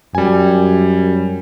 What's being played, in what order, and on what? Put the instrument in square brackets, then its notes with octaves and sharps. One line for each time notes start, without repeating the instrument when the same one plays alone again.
[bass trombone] F#2 [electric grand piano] G3 G#5